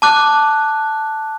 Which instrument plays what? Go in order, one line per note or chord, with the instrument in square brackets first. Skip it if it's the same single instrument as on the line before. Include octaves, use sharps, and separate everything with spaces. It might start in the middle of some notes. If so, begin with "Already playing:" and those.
[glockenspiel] A5 D6 F#6